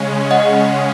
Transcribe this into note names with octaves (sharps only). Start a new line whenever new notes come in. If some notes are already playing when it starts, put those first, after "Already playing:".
Already playing: C#3 G#3 C#4
D#5 F#5